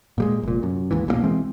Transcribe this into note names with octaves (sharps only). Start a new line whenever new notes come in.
A#2 G3 G#3
F1 A#2
F#2
D#2 G#2 E3
A#1 B2 F3 A#3
E3 G#3 C4